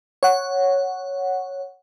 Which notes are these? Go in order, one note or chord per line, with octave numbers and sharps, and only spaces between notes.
C#5 F#5